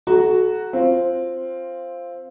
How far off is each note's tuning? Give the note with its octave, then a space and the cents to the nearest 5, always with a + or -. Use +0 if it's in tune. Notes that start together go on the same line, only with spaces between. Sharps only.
F#4 +0 A4 -30 A#5 +0
C4 +5 F4 -5